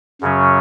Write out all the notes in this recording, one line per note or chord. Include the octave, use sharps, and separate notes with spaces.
F#2 C#3 F#3 C#4